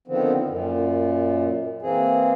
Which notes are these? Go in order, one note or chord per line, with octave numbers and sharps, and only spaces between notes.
D3 D#3 F3 B3 C4
F#2 A#2
E3 A#3 C4 G#4